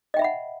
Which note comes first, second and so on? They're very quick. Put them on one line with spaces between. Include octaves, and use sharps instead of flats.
D#5 G5 E5 B5 F#5